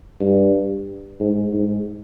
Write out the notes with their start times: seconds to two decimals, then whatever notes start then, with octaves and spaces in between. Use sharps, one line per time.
0.20 G2
1.20 G#2
1.53 G#2